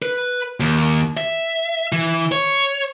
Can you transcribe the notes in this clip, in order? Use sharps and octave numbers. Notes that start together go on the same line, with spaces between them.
B4
D#2
E5
E3
C#5